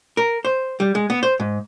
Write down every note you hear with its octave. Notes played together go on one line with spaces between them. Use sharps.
A#4
C5
G3
G#3
B3
C5
G#2